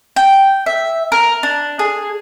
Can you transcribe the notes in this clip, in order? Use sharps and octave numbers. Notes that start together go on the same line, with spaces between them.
G5
E5
A#4
D4
G#4